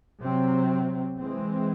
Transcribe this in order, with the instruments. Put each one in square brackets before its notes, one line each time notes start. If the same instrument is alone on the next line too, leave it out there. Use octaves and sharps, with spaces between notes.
[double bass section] C3 F#3 C4
E3 G#3 C4